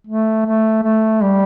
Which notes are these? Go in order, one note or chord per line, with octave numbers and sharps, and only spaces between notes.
A3
A3
A3
G3